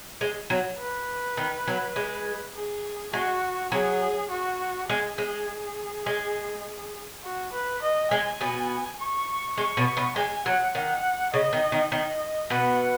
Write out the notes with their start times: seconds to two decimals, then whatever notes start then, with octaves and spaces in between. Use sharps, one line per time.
0.21 G#3
0.50 F#3
0.79 B4
1.37 D#3
1.68 F#3
1.96 G#3
2.55 G#4
3.13 G#3 F#4
3.72 F#3 G#4
4.30 F#4
4.90 G#3 G#4
5.18 G#3
6.06 G#3
7.24 F#4
7.52 B4
7.82 D#5
8.11 G#3 G#5
8.41 B2 B3
8.99 C#6
9.57 G#3 C#6
9.77 B2 B3
9.97 B2 B3
10.16 G#3 G#5
10.45 F#3 F#5
10.75 D#3 F#5
11.33 C#3 D#5
11.53 D#3
11.72 D#3
11.92 D#3 D#5
12.50 B2 B3 F#5